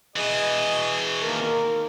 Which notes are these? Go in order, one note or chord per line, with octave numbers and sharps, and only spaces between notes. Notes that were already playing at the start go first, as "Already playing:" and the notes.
B2 E3 G#4 D#5
D#3 A#3 A#4